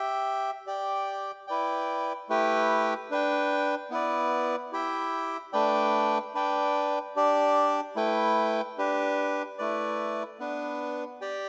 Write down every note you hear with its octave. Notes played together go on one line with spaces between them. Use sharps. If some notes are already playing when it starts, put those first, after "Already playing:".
Already playing: G4 E5 G5
G4 D5 G5
E4 B4 D5 G5
A3 E4 G4 B4 G5
D4 B4 G5
B3 E4 B4 D5
E4 G4 E5 G5
A3 D4 B4 D5 G5
D4 B4 D5 G5
D4 G4 D5
A3 E4 B4 G5
D4 G4 B4
A3 E4 B4 D5
B3 D4 B4
G4 D5 G5